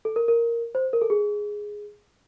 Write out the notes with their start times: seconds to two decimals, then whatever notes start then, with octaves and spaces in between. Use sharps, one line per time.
0.05 A4
0.16 A#4
0.28 A#4
0.75 C5
0.93 A#4
1.02 A4
1.10 G#4